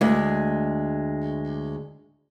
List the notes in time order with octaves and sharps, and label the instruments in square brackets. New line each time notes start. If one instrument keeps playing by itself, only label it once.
[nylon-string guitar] D2 G#3